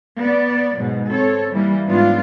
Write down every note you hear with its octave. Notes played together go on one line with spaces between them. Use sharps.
B3 D5
G#2 B2 F#3
C4 A4 C#5
E3 G3 A#3
G#2 F#3 B3 D4 F4